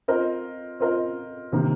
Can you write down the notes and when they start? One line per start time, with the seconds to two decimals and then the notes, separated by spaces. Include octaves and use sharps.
0.08 C4 F4 A#4 D#5
0.80 C4 F4 A#4 D#5
1.52 C3 D#3 A#3